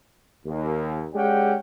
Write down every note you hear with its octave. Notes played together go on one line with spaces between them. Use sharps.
D#2
G#3 C#4 G4 D5 F#5 G5